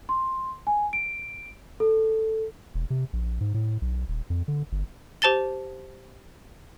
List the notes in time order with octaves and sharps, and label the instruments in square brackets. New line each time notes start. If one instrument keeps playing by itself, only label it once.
[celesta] C6
G#5
D7
A4
[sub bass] E1
C3
A#1
G#2
A2
B1
D#1
F2
D3
G1
[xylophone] G4 C5 A5 A6 G7